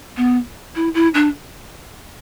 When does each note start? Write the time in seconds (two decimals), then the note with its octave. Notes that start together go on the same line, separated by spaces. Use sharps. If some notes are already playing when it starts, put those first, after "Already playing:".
0.17 B3
0.75 E4
0.94 E4
1.14 D4